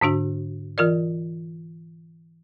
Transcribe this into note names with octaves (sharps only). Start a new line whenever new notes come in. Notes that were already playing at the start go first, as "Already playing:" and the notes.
G#2 D3 D4 F#4
E3 F4 A#4 D5